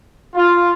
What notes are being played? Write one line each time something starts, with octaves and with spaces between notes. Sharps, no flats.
F4